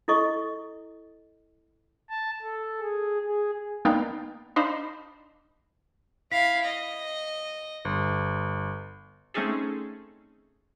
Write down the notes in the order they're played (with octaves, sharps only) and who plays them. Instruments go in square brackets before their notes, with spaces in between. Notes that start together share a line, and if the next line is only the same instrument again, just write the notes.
[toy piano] E4 A4 D#5 C#6
[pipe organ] A5
A4
G#4
G#4
[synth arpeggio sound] A#3 B3 D4 D#4 F5 G5
D4 D#4 C5 F5 B5
[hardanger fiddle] E4 F5 [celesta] B6
[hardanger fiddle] D#5
[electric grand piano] G1
[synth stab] A3 C4 C#4 D#4 G#4 A4